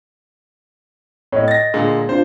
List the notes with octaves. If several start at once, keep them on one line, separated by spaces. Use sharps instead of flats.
A2 C#5 D#5
A6 A#6
A#2 D3 G#3
D4 F4 C5